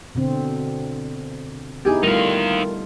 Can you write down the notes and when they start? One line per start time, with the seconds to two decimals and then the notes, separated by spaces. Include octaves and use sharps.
0.15 B2 D3 C4
1.85 B3 D#4 E4 G4 G#4
2.03 D#3 G3 A3 D#4 F4 F5